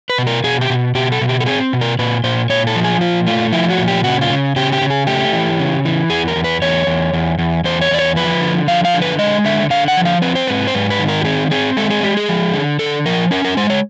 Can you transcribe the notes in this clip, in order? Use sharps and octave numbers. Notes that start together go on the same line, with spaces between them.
B4
B2
A#4
B2 G#4
G4
B2
B2 G4
A4
B2
G4
A4
C4 G#4
B2
A#4
A#2 B4
A#2 C5
A#2 C#5
A4
F3
G#4
A#2 F4
A3 F4
F3 E4
F#4
A#2
G4
C#3 F#4
F4
C#3
C#3 G4
G4
C#3
G#4
A3 G4
E3
C#3
E3
E2 G#4
A#4
E2
B4
E2 C#5
E2
E2
E2
E2 C5
C#5
E2 D5
C#5
F3 B4
D3
F3 F5
F5
D3
B4
G#3 D#5
D3 E5
D3 F5
F#5
F3
F5
C4 B4
C5
G#2 B4
C5
G#2 B4
B4
D#3
A#4
G4
C4 G#4
C4 G#4
G#3 A4
G#4
G#3 G4
G#4
F3
D3
D3 A4
F3 A#4
C#4 A#4
A#4
G#3 C5
C#5